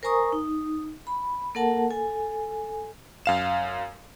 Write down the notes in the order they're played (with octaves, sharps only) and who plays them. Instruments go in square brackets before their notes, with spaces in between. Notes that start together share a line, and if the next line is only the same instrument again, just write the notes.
[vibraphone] A#4 C5 G#5 A#5 C#6 D#6
D#4
B5
A#3 A4 A#4 F#5 A5
A4 G#5
[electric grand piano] F#2 F5 E7